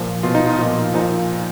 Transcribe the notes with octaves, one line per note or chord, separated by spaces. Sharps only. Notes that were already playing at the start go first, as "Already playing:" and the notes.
Already playing: A#2 F3
B2 F4
D#4
F4
A#2 F3
A#2 F3 D#4